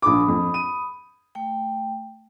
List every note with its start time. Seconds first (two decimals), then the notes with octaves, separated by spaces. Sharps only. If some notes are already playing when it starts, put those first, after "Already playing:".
0.02 A#1 B5 D6 D#6
0.28 F2
0.54 D#7
1.35 A3 G5